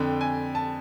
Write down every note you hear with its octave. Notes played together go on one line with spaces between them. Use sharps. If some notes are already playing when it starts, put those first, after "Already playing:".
Already playing: F2 D3 G5
G#5
A5